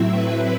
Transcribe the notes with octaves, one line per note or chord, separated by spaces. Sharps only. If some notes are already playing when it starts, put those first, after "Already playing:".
Already playing: A2 F#3 C4 E4 E5
B4